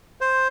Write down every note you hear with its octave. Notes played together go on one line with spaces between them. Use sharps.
C5